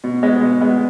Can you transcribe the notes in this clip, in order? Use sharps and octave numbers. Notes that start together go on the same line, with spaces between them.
B2
G#3 B3
B2
G#3 B3